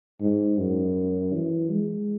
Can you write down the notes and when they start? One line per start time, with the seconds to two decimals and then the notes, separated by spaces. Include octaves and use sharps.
0.21 G#2
0.58 F#2
1.33 E3
1.71 G#3